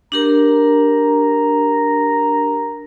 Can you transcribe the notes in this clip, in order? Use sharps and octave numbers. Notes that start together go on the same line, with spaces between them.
D4 G4 A#4 A#5